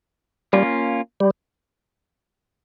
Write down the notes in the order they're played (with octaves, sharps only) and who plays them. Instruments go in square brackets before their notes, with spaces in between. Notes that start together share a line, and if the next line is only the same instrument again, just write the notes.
[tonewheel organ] G3 [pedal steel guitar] A#3 C#4 F4
[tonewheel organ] G3